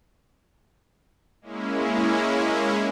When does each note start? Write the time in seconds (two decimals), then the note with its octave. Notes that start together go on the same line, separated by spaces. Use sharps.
1.41 G#3 A#3 C#4 E4